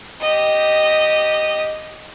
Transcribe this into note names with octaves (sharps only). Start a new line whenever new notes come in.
G4 D#5